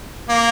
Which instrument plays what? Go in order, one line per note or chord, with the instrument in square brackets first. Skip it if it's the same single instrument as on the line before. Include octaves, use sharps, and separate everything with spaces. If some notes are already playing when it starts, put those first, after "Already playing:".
[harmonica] A#3